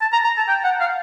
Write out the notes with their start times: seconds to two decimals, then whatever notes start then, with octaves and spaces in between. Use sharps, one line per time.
0.01 A5
0.12 A#5
0.24 A#5
0.37 A5
0.48 G5
0.64 F#5
0.80 F5